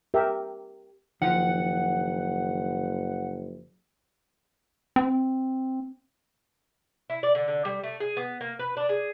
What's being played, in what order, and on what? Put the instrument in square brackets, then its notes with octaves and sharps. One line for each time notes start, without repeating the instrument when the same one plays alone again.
[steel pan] G4 A#4 E5
[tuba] F#1 [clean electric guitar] D#3 [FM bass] F3 [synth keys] F#5
[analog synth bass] C4
[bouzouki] E4
D5
D3
D3
G3
A3
G#4
B3
A#3
B4
D4
G#4